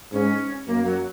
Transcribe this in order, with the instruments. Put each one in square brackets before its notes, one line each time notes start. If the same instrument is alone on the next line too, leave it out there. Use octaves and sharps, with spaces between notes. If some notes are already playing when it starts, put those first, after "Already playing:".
[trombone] G#2 [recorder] C#4
[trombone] F#2 [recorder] A#3
[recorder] F#3